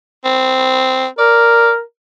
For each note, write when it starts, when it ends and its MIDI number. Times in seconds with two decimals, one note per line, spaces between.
0.25 1.07 60
1.18 1.81 70
1.18 1.71 74